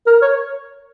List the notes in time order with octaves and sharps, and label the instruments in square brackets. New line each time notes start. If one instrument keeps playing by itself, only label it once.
[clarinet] A#4
C#5